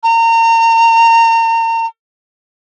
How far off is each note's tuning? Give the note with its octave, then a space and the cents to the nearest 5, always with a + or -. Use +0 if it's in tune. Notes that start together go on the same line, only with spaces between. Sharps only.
A#5 -35